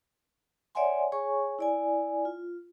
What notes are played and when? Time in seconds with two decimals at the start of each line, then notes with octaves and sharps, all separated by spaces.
0.75 C#5 D5 E5 F#5 G#5 C6
1.12 G#4 C#5 G#5 C#6
1.59 E4 D5 G#5
2.25 F4